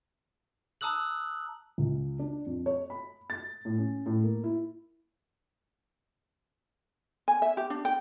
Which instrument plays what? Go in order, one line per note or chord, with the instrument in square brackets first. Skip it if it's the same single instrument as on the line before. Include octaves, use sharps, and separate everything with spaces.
[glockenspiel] A5 A#5 D#6 E6 F#6 F#7
[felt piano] C#2
D4
F2
C#5
B5
A6
A2
C#4
A2
A#3
E4
[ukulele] G#5
E5
G4
D4
G5